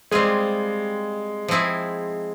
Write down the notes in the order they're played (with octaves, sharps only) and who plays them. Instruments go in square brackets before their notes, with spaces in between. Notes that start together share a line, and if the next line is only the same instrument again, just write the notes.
[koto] G3 C4 F4 G#4 [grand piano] G#3
[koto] F3 C4 E4 G#4